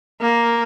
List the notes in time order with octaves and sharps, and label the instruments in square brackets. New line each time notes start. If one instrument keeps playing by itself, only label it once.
[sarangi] A#3